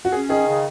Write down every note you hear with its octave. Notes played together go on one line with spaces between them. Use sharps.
F#4
C#4 G#4
D#3 G#4
C#3